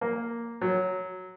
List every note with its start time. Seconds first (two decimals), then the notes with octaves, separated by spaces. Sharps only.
0.01 A#3
0.61 F#3